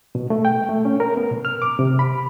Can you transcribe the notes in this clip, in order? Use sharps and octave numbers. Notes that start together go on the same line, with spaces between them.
B2
A3
G5
A3
C#4
A#4
B3
B2
F6
D6
C3
B5